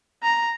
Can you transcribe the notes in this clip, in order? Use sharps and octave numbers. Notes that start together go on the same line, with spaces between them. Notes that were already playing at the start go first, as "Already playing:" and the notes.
A#5